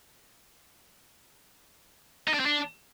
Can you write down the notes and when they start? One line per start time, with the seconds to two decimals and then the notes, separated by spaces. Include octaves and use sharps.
2.28 D#4
2.34 D4
2.40 C4
2.46 D4